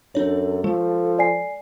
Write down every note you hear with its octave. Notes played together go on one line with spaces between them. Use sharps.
F#2 D4 A4 C#5
F3 G#3
D5 G#5 C7